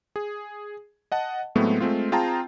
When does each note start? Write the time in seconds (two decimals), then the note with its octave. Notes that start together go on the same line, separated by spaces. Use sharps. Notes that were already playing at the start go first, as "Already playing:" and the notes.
0.16 G#4
1.12 D#5 F#5 A5
1.55 A2 F#3 G#3 A3 B3 C4
1.80 G#3 A3 C4 F4
2.12 C4 F4 G#4 G5 A5 A#5